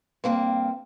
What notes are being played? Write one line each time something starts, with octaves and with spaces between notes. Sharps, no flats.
G2 A#3 C4